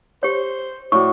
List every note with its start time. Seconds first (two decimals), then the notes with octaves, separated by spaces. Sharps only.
0.23 G4 C5 C#5
0.92 A2 F#4 D5 C#6